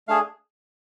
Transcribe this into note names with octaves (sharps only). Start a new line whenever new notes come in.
A3 D4 G#4 F5